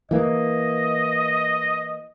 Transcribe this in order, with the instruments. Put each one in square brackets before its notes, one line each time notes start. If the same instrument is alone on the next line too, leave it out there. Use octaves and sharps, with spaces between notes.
[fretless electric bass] E3 A#3 [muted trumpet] D#5